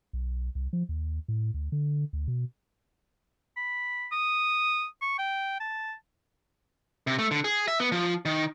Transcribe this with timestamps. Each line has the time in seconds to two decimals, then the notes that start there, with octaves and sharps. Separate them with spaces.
0.13 B1
0.55 C2
0.73 F3
0.89 D#2
1.28 A2
1.54 D2
1.72 D3
2.13 D2
2.28 B2
3.56 B5
4.12 D#6
5.02 C#6
5.19 G5
5.60 A5
7.07 C3
7.19 A3
7.31 D3
7.44 G#4
7.68 E5
7.80 B3
7.92 F3
8.25 D#3